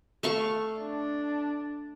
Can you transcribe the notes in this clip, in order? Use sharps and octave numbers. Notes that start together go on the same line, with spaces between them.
A3 F5 C#6
D4